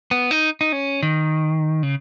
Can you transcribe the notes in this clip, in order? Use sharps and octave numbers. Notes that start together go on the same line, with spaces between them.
B3
D#4
D#4
C#4
D#3
C#3